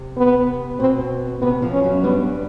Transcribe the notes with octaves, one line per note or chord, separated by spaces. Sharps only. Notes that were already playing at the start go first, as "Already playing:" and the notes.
Already playing: C3
B3
B2 C4
C3 B3
F2 F3
C#4
F#2 F#3
G2 G3 B3